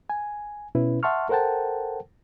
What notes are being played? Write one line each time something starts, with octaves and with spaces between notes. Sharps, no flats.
G#5
B2 C#4 E4 B4
E5 F#5 A5 C6 C#6 F6
A4 A#4 C5 F#5 G5 A5